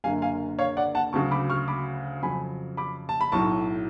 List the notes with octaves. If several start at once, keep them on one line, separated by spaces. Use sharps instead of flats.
F#1 F#2 D3 F5 G#5
F5 G#5
C#5 F5
D5 F#5
F#5 A5
D2 C#3 F#3 A5 C#6
B5 D6
C#6 F6
B5 D6
F2 C#3 F#3 G#5 B5
B5 D6
A5
B5
B1 A2 F#3 A5 C#6